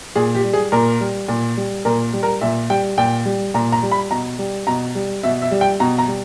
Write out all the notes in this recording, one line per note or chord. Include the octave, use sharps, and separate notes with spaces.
A#2 G#4
G4
G3
G#4
A#2 A#4
G3
A#2
G3
A#2 A#4
G3
A#4
A#2 E5
G3 G5
A#2 G5
G3
A#2 A#5
A#5
G3
B5
B2 A#5
G3
B2 A#5
G3
B2 E5
E5
G3
G5
B2 A#5
A#5
G3